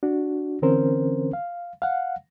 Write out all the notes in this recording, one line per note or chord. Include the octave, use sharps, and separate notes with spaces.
D4 F#4
D3 E3 C4 C#4 A#4 C5
F5
F5 F#5